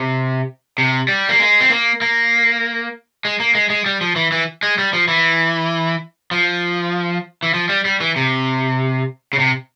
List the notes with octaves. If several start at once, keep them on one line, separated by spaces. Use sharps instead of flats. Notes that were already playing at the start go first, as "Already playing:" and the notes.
Already playing: C3
C3
G3
A#3
G#3
C4
A#3
A#3
G#3
A#3
G#3
G#3
G3
F3
E3
E3
G#3
G3
F3
E3
F3
E3
F3
G3
G3
E3
C3
C#3
C3